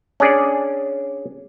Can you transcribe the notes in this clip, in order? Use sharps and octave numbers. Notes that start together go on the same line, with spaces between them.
C#4 D4 G#4 D5